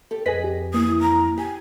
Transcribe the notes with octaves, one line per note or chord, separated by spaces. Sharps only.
G4 A4
F2 G#4 B4 D#5 G#5 A#6 B6
G4
E3 A#3 D#6
A#5
G4 G#5